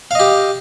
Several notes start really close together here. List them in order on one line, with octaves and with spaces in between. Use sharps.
F5 D#5 G4